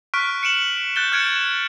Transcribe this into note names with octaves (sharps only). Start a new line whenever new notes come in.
C#6 F6 F#6 B6 D7
C#7 D7 E7 F#7
F#6 G6 A6 G7
F6 F#6 G#6 C#7 D7 E7
E7